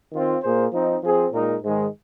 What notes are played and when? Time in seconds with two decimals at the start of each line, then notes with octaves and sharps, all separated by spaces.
0.12 D#3 C4 F4
0.43 A#2 A#3 G#4 C5
0.73 F3 C4 D#4
1.03 F3 C4 G#4 C5
1.32 A#2 G#3 D#4 A#4
1.63 G#2 D#3 G#3